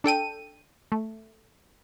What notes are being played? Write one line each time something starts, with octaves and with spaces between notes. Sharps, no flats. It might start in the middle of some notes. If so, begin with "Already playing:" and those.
D4 A4 G5 D#7
A3